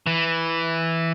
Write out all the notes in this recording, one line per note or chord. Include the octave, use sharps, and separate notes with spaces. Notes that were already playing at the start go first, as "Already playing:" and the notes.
E3